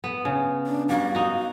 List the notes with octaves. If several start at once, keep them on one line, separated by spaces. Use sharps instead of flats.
B3
C#3
D4
G3 F#4 F5
D#4 F#4